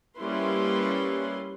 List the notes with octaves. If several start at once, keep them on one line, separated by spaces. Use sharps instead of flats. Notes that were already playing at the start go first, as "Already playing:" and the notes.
G3 A#3 C#4 E4 B4 C6